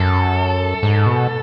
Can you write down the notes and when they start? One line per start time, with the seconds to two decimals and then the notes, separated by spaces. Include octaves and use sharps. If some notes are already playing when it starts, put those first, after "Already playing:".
Already playing: F#2 A4
0.83 G#2
1.06 B2